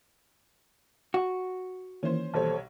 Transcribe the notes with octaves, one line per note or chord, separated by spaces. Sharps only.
F#4
D#3 E3 A#3 C#4 C5
B1 G3 A4 C5 C#5 A5